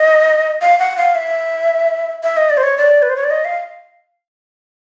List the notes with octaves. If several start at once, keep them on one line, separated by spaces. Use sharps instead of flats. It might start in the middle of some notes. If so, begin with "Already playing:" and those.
Already playing: D#5
F5
F#5
F5
E5
E5
D#5
D5
C5
C#5
D5
B4
C5
C#5
D5
D#5
F5